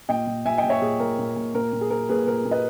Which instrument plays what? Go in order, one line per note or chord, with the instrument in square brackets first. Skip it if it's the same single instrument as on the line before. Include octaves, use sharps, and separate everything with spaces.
[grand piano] A#2 D#5 G5
A#2
A#2 E5 G#5
D#5 G5
A#2
C#5 E5
A#2 G#4
A#2 A#4
A#2
A#2
A#2 A#4
A#2
G#4
A#2 A#4
A#2 G#4 B4
A#2 A#4
A#2
B4 D#5